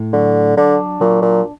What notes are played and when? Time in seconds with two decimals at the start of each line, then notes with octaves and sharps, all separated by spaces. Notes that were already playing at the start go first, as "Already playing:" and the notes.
Already playing: A2
0.13 D3 F#3
0.57 D3 D4
1.01 A#2 F#3
1.22 A#2